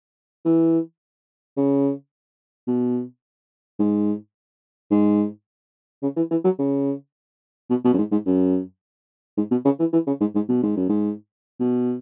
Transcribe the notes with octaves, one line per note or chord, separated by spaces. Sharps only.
E3
C#3
B2
G#2
G#2
C#3
E3
E3
F#3
C#3
B2
B2
F#2
G#2
G#2
F#2
G#2
B2
C#3
E3
E3
C#3
G#2
G#2
B2
G#2
F#2
G#2
B2